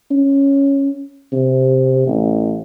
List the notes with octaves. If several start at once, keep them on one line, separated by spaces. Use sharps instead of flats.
C#4
C3
A1